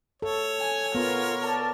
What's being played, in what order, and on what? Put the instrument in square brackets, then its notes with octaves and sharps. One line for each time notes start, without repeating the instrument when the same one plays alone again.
[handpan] A4 [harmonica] C#5
[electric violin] G#5
[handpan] B3 [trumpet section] F4 [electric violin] A#4
[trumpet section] D5 A5